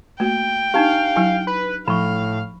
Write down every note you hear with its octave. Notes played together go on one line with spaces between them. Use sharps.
A3 A#3 F#4 G5
D4 D#4 G4 F5
F#3 E4 G#5
B4
A2 F3 F5 B5 C#6